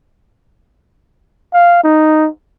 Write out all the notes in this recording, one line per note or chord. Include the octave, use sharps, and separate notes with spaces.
F5
D#4